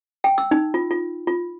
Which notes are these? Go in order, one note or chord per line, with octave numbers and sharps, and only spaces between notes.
G5
E6
D#4
F4
F4
F4